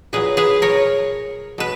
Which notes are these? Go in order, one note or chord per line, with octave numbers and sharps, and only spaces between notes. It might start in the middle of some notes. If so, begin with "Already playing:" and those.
A#2 F#3 G#4 B4
G#4 B4
A#4 C#5
B2 B4